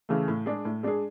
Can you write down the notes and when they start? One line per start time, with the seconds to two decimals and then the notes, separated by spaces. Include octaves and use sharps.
0.09 C#3 E3 A3
0.28 A2
0.46 G#3 D4 G#4
0.65 A2
0.83 G#3 D4 G#4